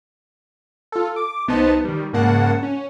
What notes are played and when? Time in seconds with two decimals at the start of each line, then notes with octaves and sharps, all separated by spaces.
0.92 F4 A4
1.16 D6
1.48 C2 B3 D#4 C5 A5
1.85 D#3 G3
2.13 G#2 C#3 A#3 F#5 A5
2.63 C#4